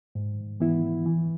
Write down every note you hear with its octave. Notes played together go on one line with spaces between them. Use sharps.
G#2
E3 B3 E4
E3